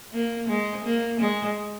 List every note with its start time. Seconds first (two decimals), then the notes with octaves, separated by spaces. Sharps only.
0.13 A#3
0.49 G#3
0.84 A#3
1.20 G#3